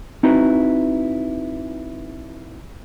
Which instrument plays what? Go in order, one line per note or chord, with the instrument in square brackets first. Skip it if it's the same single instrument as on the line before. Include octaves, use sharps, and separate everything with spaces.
[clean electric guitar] C4 D#4 E4 F#4 B4